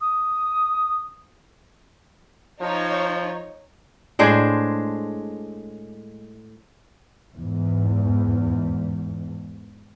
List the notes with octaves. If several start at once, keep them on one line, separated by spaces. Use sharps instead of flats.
D#6
F3 D#4 C#5
A2 G#3 D4 C5
E2 G#2